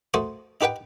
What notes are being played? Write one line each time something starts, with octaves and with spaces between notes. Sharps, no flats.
A3 F#4 C5 C6 C#6 D#6
D#4 G4 B4 F#5 G5